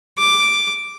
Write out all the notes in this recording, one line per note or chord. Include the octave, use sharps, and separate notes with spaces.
D6